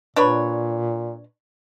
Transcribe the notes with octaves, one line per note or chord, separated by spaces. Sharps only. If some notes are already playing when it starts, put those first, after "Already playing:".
A#2 D4 B4 C#5